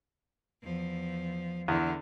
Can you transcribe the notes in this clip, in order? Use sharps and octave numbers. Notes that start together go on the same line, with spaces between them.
E2 F3
E2 D3